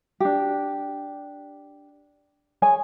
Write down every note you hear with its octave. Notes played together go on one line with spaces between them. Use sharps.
D4 G4
G#4 C#5 G#5